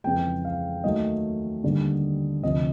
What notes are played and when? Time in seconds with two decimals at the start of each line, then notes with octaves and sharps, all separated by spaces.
0.04 F2 C#3 E3 G#3 G5
0.45 F5
0.84 D#2 D#3 F#3 A3 D#5
1.64 D#2 D3 G3
2.43 D2 C3 F3 D#5